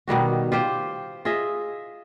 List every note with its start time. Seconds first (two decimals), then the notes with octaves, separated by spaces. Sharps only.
0.08 B2 D#3 G3 F#4
0.52 F4 G4 C5
1.25 F4 G#4 D#5 E5